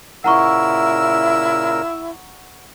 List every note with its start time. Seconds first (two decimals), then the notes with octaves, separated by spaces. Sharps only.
0.24 A#2 C#3 E4 A#4 F#5 A#5 C#6 E6